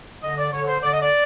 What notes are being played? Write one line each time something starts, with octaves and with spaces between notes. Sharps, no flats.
D3 D#5
D5
D3 C#5
C5
D3 D5
D#5
D5